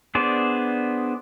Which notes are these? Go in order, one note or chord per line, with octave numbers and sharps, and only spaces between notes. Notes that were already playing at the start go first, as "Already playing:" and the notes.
B3 D4 G#4 C5 D5